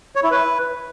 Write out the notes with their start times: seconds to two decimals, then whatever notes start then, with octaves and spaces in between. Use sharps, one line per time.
0.16 C#5
0.23 E4
0.31 B4